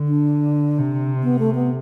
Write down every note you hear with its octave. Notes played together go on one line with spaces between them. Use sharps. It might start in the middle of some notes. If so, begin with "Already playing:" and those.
Already playing: D3
D4
C3
B3
A3
B3